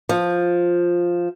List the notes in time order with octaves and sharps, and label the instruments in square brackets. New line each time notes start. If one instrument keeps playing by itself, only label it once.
[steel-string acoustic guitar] F3